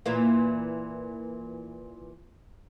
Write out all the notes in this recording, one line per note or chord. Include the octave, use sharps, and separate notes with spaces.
A#2 E3 A#3